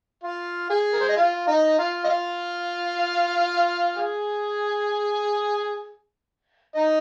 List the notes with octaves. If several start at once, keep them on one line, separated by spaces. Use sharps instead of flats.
F4 F5
G#4 G#5
A#4
C5
D#5
F4 F5
D#4 D#5
F4 F5
D#5
F4 F5
G#4 G#5
D#4 D#5